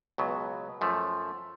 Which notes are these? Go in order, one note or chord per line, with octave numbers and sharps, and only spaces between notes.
C#2 B2 F#3 B3
F#2 F3 A3